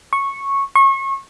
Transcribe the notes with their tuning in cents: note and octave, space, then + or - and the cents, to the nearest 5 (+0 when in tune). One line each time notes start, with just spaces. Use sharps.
C#6 -10
C#6 -30